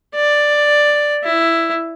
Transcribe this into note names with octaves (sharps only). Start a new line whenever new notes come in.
D5
E4